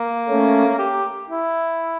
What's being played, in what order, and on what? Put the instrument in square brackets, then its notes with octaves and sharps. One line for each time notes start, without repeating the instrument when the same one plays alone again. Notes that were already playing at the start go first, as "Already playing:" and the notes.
Already playing: [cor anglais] A#3
[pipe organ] A3 C#4
[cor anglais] G4
E4